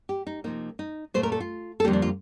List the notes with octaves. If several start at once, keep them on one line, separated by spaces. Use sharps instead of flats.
G4
D#4
C3 F3 A#3 D#4
D#4
A#2 A3 C5
A#4
A4
F4
A4
F2 D3 G3 A#3 G4
D4
F4